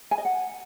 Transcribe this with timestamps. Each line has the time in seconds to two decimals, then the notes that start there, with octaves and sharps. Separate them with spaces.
0.11 G#5
0.18 D#5
0.25 F#5